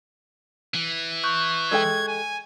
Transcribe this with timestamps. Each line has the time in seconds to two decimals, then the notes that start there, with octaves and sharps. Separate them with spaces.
0.75 E3
1.24 C#6 F#6 G6
1.71 G#3 A4 G5 G#6
2.08 G#5